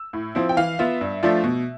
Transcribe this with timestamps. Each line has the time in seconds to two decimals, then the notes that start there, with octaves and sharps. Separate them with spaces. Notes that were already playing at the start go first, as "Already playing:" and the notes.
Already playing: E6
0.13 A2
0.35 F3 C4 E4
0.49 G5
0.57 E3 F5
0.79 B3 F4 E5
1.01 G2
1.23 F3 A3 D4 F4
1.44 B2